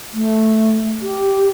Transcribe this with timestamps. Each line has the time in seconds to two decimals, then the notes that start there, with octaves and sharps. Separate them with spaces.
0.13 A3
1.02 G4